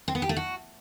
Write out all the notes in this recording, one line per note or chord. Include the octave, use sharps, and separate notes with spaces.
C4
B3
G4
A3
F#4